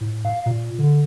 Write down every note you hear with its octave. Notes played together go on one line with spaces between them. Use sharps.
A2
F5
A#2
D3